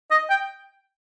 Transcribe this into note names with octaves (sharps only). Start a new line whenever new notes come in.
D#5
G5